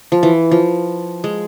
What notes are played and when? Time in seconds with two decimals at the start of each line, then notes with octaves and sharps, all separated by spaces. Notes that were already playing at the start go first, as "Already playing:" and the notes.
0.12 F3
0.23 E3
0.51 F3
1.24 G#3